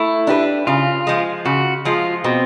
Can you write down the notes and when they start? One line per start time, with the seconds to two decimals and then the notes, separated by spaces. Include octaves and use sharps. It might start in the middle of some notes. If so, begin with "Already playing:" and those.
Already playing: A3 E4
0.27 D4 G4 B4
0.67 C#3 F4
1.07 F3 G#3
1.45 C#3 F#4
1.85 F3 G#3 F4
2.24 B2 C4